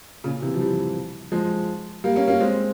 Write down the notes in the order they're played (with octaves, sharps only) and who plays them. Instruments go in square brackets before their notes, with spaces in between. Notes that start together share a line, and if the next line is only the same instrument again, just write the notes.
[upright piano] A#2 C#3
C3 E3
F3
E3 G3
F3 G#3
G3 A#3
A#3 C#4
A#3 C#4
G#3 C4